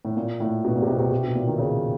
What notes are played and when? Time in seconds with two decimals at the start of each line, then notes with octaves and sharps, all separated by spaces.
0.05 A2
0.17 A#2
0.40 A2
0.64 B2
0.76 A#2
0.82 C3
0.88 B2
0.99 C3
1.11 C3
1.24 B2
1.35 A#2
1.47 D#3
1.58 C#3